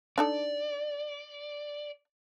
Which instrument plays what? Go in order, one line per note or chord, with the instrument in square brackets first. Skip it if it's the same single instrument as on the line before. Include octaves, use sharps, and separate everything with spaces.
[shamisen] D4 D#4 A4 [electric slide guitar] D5